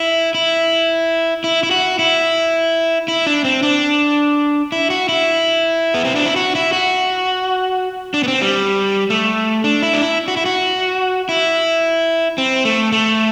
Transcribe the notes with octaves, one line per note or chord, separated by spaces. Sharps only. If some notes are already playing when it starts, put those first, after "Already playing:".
Already playing: E4
E4
E4
E4
F#4
E4
E4
D4
C4
D4
E4
F#4
E4
B3
C4
D4
E4
F#4
E4
F#4
D4
B3
C4
G3
A3
D4
E4
D4
E4
F#4
E4
F#4
E4
C4
A3
A3